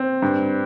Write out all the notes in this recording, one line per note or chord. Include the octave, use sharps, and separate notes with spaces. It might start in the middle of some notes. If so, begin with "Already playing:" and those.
Already playing: C4
G2